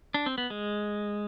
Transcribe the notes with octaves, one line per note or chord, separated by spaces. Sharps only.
D4
C4
B3
G#3